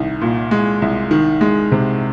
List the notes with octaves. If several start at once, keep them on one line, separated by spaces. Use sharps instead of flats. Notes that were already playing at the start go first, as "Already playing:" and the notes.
Already playing: C2 D#3
A#2
G#3
C2
D#3
G#3
C3